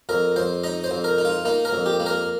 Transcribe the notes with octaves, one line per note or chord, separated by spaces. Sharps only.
F2 A#4
F2 C5
D#4 D#5
C5
F2
A#4
D#4
F4
A#3 D#4
A#4
F2
G4
A#3
A#4